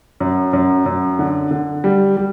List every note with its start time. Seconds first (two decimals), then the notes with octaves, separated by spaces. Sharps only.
0.20 F#2
0.53 F#2
0.86 F#2
1.19 D3
1.51 D3
1.84 G3
2.17 G3